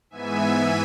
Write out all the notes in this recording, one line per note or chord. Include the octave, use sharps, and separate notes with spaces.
G#2 E3 B3 E5 G#5